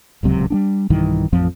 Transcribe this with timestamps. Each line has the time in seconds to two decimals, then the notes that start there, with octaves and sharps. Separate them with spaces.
0.23 D1 C#2 C3 F#3
0.50 G3 B3 D4
0.90 B1 G2 D#3 E3
1.32 A1 F2 F3 C4